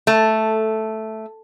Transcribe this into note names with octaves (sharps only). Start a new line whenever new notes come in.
A3